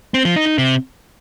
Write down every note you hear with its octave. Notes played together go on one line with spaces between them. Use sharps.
C4
F3
D#4
D#4
C3